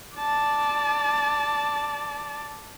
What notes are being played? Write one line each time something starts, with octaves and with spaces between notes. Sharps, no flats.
D5 A5